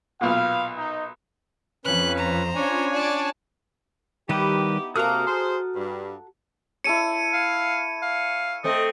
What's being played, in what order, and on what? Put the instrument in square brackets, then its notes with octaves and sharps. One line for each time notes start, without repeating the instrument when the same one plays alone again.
[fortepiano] B1 A#2 [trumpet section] B4 F5
[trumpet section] D#4
[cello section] F2 [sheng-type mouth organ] C#4 B4 [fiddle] F#6
[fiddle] C5 A#5
[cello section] C#4 F4 [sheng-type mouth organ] D4 C#5 G#5
[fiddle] D5 A5
[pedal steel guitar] D#3 G3 B4 [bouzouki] B3 D#4 E4 [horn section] G4
[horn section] C3 A#3 [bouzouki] F#4 A4 A#5 [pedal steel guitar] D#6 F6
[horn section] G#4 C5
G2
[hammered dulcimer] E4 A4 C#5 [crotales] C#7 D#7
[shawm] F5
F5
[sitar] A3 C4 [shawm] D#5